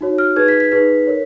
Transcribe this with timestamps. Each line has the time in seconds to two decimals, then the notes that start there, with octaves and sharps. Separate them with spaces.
0.01 D#4 F#4 C#5
0.18 F6
0.36 D#4 G#4 B4 G#6
0.48 B6
0.60 B6
0.71 D#4 G#4 B4 B6
1.07 A#4 C#5